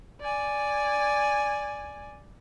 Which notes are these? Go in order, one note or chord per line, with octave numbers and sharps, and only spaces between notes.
D5 G#5